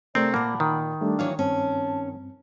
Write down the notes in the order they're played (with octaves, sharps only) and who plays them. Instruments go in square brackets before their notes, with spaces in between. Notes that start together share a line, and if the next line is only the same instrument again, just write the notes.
[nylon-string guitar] C3 A3 D4 [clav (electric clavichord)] C4 [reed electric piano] A#4 A#5 [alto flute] D5
[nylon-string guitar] A#2 A#4 [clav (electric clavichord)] A#3 [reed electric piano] F#5 A5 D6 [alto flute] B5
[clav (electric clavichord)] D#3
[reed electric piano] G3 A3 [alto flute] D4
[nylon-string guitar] E3 F#3 C#5 [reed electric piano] F5
[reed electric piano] G2 C4 [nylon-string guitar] C#4 [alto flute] A5